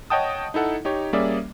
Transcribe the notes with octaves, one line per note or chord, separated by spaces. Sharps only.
C#5 D#5 F#5 G5 A5 D#6
D#4 E4 A4 F#5
D#4 G4 C#5
G3 A#3 C#4 G#4 D5 E5